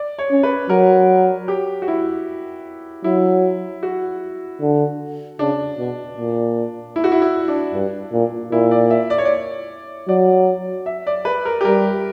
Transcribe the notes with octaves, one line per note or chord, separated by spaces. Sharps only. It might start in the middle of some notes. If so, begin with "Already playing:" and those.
Already playing: D5
C#5
C#4
B4
F#3 A#4
G4
F#4
E4
F#3 E4
F#4
D3
C#3 D4
B2
A#2
E4
F#4
E4
E4
D4
G2
A#2
A#2 E4
D5
E5
D5
C#5
D5
F#3 D5
E5
D5
B4
A#4
G4
G3 A#4